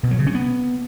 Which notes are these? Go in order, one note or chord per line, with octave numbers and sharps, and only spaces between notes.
B2
F#3
C#3
C#4
B3